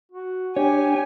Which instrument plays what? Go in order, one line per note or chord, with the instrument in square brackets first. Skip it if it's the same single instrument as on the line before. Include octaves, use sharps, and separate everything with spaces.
[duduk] F#4
[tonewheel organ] D4 [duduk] G4 [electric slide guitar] C#5 [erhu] G#5